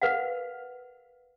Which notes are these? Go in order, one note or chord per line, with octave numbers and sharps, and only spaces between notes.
A#4 B4 F5 F#5